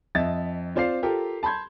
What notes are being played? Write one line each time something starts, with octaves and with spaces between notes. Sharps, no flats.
F2 D#5 E5 A6
C4 F4 C5 D5 F5 C7
F4 G4 A4 A#4
A5 B5 C6 G6 G#6